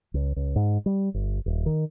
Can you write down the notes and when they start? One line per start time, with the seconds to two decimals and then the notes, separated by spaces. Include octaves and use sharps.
0.14 C#2
0.36 C#2
0.56 G#2
0.86 G3
1.14 G1
1.46 D#1
1.66 D#3